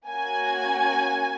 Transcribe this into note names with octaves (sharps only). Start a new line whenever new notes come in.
A#3 C#4 F#4 G#5